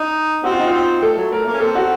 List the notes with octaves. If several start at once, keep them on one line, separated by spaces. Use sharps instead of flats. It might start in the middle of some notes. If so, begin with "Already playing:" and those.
Already playing: D#4
C4 F#4
F4
D#4
C4 F4
A3 A4
F#3
A3 A#4
A#3
C#4
C4 A4
F#4